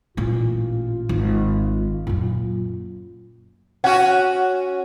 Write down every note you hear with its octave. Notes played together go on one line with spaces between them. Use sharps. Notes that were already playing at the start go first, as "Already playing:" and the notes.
A1 A#2 F4
G#1
F#2 A#2
C#4 F#4 F#5